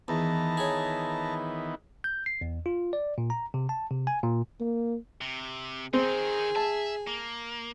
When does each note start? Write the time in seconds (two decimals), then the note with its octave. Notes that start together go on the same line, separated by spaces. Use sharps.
0.08 E2 D#3 E3 B3 A5 A#5
0.57 G#4 C#5
2.04 G6
2.26 C7
2.41 E2
2.66 F4
2.93 D5
3.18 A#2
3.30 A#5
3.54 C3
3.69 A5
3.91 C3
4.07 G#5
4.24 A#2
4.60 A#3
5.21 C3
5.93 D#3 C4 D#4 G#4
6.56 E5 A5
7.07 A#3